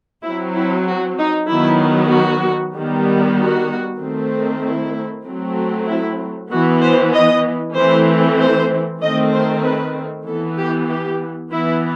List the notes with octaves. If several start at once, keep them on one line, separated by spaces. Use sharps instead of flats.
F#3 C4 E4
E4
F#4
D#4
D#3 F#3 B3 E4
F#4
D#3 G3 B3
F#4
D#3 A3 C4
E4
F#3 A3 C4
E4
E3 B3 F#4
C5
D#5
E3 A3 C4 C5
C5
D#3 A3 C4 D#5
C5
B4
E3 B3 A4
G4
G4
E3 B3 E4